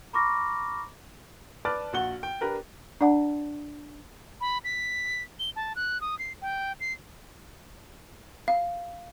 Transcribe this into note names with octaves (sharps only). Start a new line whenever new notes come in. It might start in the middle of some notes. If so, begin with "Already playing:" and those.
A#5 B5 C#6 D6 F6 A#6
B4 D5 A5 D6 F6 A6
A#1 F#4 F#5 G7
G5
D4 G4 A#4 B4
D4 D5 F#5 A5
B5
B6
G7
A5
F#6
D#6
C7
G5
C7
F5